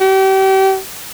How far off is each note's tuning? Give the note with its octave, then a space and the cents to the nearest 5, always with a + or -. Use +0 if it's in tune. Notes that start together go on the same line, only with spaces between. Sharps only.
G4 -35